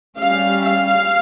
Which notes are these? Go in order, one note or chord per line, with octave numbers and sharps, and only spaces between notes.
G3 C#4 F5
F5